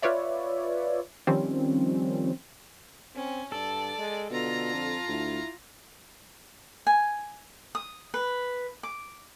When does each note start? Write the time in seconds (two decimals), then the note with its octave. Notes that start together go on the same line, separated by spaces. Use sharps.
0.02 F4 B4 C#5 D5 E5
1.27 D#3 F3 G3 C4 C#4
3.15 C4 C#4
3.52 G2 A4 D5
3.98 G#3
4.31 B2 D3 F4 A#5
4.74 F2
5.08 D2 E4
6.87 G#5
7.75 D#6
8.14 B4
8.83 D6